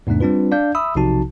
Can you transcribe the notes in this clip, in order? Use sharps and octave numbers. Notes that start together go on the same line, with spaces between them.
E2 G#2 C3 A3 D4
G3 C4 D4 F4 B4
D4 D5 F5 G6
E5 B5 D#6 E6
B1 C3 F3 D#4 F#4 A5